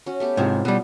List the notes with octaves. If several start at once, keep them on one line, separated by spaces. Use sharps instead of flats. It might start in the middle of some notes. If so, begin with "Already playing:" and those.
C#4 F#4
A3 B3 G4
G#2 C3 E4 F4
B2 G3 B3